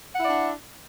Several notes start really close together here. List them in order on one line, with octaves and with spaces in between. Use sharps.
F#5 E4 E5 D5 D4